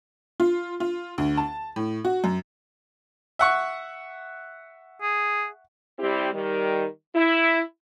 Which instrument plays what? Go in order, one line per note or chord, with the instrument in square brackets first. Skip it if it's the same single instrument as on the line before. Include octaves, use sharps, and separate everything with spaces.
[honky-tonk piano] F4
F4
D2
A5
A2
F#4
F#2
[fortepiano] E5 F#5 C#6
[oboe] G#4
[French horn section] G3 C4 E4 G4
D#3 G3
E4